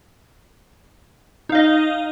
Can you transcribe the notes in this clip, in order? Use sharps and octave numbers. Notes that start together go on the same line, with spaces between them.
D#4 D#5 F5